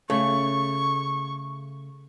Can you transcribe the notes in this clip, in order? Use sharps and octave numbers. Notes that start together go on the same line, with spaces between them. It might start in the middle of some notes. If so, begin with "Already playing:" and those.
C#3 A3 C#6